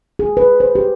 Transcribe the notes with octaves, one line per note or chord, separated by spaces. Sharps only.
G#4
B4
C5
G4